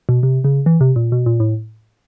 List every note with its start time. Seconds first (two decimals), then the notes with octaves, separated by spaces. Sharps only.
0.09 B2
0.23 C3
0.44 C#3
0.66 E3
0.81 C3
0.96 A#2
1.12 B2
1.26 A#2
1.40 A2